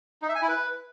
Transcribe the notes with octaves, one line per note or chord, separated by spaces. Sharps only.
D#4
E5
G#5
E4
B4